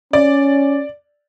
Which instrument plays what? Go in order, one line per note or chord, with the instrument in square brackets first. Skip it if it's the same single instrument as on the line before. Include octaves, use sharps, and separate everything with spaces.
[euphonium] C#4 [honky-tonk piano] D5